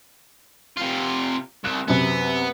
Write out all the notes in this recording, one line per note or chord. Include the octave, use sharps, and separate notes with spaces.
C3 F4
C2 F#6 E7
F#2 C3 B3